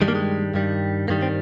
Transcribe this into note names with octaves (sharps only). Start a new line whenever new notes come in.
G2 D#3 G3 G#3
A#3
G#3
G2 D#3 G3
G2 D#3 G3 A#3
C4